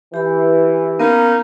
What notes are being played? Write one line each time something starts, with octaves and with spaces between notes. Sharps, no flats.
E3 G4 B5
A#3 B3 C#4 D#4